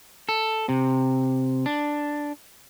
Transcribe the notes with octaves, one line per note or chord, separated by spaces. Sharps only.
A4
C3
D4